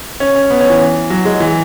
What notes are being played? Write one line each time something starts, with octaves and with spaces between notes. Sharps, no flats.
C#4
C#4
B3
C#4
E3
F#3
G#3
E3